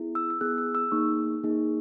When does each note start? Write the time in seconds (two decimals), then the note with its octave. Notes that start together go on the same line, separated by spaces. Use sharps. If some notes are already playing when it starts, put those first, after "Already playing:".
Already playing: B3 E4 G#4
0.15 E6
0.30 E6
0.41 B3 E4 G#4 F#6
0.58 E6
0.75 E6
0.92 A#3 D#4 G#4 C#6
1.44 A#3 D#4 G#4